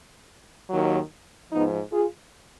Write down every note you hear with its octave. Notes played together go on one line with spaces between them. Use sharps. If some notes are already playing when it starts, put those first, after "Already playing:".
D#2 D#3 F#3
G#2 F3 B3 D#4
F4 G#4